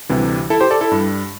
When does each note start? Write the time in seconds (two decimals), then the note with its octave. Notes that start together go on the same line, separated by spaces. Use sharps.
0.09 D2 C3 E3 G3
0.50 E4 A4
0.60 G4 C5
0.71 A4 D5
0.81 E4 A4
0.92 G2 G3